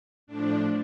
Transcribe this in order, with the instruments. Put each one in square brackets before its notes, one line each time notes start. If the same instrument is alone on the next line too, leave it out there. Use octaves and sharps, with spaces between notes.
[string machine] A2 F3 D4